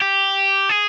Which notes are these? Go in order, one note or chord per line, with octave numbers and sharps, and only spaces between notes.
G4
G#4